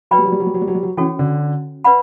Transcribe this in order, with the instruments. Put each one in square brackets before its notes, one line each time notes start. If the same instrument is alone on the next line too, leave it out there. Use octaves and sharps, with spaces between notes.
[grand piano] F#3 [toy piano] B4 D5 G5 B5
[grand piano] G3
F#3
G3
F#3
G3
F#3
G3
F#3
G3
F#3
[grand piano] E3 [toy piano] C#4 F#4 A4 C#5 G5
[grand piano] D3
[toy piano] B4 D5 F#5 B5